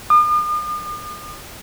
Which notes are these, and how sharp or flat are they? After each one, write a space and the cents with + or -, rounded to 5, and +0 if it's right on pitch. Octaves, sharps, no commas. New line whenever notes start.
D#6 -45